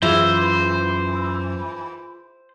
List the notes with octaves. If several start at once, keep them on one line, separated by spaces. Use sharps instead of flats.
F#2 E3 E4 F4 G#4 C5